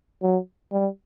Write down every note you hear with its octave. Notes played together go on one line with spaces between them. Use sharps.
F#3
G3